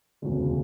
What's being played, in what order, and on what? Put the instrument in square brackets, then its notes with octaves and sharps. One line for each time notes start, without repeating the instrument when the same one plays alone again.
[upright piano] E1 D2 C#3 G#3